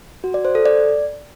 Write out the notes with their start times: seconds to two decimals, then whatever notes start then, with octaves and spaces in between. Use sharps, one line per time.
0.24 F#4
0.34 D5
0.45 C5
0.55 A4
0.66 D5